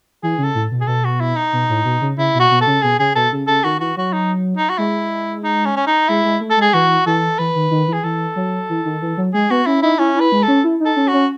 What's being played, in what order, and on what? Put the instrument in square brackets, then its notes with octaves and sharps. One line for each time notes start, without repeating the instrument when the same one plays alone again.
[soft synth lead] E3 [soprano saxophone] G#4
[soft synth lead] C#3
[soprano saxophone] A4
[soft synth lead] A2
B2
[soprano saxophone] G#4
[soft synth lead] B2 [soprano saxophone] A4
[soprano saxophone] F#4
E4
D#4
[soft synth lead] B2
A2
B2
C#3
[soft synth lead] C#3 [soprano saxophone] E4
[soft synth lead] B2
[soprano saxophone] F#4
[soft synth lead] B2
[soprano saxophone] A4
[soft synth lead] C#3
[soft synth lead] B2 [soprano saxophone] G#4
[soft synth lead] C#3 [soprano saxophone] G#4
[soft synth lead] B2 [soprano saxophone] A4
[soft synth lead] C#3
[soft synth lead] C#3 [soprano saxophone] A4
[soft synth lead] D#3 [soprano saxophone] F#4
[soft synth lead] E3 [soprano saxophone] F#4
[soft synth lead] F#3 [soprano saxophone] F#4
[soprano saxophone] D#4
D#4
F#4
[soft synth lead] G#3 [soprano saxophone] E4
[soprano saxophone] D#4
C#4
C#4
D#4
[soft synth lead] G#3 [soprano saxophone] E4
[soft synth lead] G#3
A3
[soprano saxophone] A4
[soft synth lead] G#3 [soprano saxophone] G#4
[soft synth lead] E3 [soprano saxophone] F#4
[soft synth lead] E3 [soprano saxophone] A4
[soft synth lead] E3 [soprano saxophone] B4
[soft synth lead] D#3
D#3
E3
[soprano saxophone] G#4
[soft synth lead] E3 [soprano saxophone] A4
[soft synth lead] F#3
E3
D#3
E3
F#3
[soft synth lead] G#3 [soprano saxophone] G#4
[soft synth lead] B3 [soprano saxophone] F#4
[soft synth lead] C#4 [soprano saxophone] E4
[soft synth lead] D#4 [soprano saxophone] E4
[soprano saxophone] C#4 [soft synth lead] E4
[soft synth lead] E4 [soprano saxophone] B4
[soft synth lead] G#3
[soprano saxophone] A4
[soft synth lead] C#4
E4
[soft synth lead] D#4 [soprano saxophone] A4
[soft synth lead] C#4
[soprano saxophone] F#4
[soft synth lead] C#4